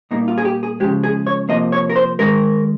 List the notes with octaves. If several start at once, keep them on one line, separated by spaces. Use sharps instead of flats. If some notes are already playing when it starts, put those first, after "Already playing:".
A#2 G3 A#3 D#4
F4
G#4
G4
G#4
C#3 F3 G#3 G4
G#4
C#5
C3 F3 A#3 D#5
C#5
A#4
C5
D#3 G#3 A#4